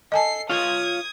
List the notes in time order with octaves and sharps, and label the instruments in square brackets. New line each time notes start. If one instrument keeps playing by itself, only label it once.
[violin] A4 C7 [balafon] D#5 G#5 A5
[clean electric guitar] F4 C#5 F5 [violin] D#6 G#6